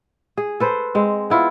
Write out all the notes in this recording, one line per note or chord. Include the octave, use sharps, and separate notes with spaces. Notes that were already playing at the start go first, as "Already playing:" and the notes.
G#4
A4 B4 C5
G#3 C4
B3 E4 F4